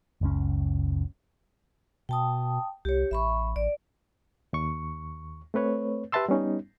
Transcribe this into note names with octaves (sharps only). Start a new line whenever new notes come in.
F#1 C#2 C#4
B2 G5 A5 D#6
C2 G4 C#5
A1 E5 B5 C#6
A1 D5
D#2 C#6
A3 C4 B4 C#5
G4 B4 E5 A5 C6 E6
G3 B3 C#4 D#4